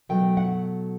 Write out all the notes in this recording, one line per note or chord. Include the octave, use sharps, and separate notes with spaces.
B2 F#3 A3 G5
F#5